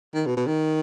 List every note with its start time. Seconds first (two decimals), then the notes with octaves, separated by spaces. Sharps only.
0.15 D#3
0.26 B2
0.37 B2
0.47 D#3